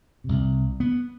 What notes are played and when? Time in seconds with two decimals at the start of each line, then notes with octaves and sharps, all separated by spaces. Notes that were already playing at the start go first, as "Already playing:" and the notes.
0.24 C2 C3
0.80 B3